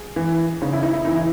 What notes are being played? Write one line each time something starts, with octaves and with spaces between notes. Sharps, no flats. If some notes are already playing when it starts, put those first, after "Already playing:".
Already playing: G#4
E3
C#3 D#4
E4
D#4
E4
E3 D#4
E4